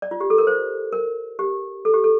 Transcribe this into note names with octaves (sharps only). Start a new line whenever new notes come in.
D5
F4
G4
A4
A#4
C5
A#4
G4
A4
G4
A4